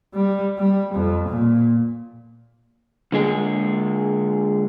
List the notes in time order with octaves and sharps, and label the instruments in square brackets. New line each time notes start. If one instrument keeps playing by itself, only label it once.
[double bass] G3
G3
F2
A#2
[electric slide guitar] D3 G#3 G#4